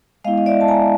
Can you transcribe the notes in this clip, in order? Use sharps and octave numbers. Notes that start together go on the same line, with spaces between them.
G#3 B3 E4 D#5 F5
D#5
D5 E5
A5
G#5 A#5